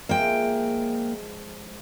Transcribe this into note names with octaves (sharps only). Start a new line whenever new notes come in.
F3 G#3 A#3 E5 G5